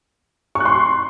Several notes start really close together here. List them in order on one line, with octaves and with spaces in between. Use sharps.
C#6 F#6 C6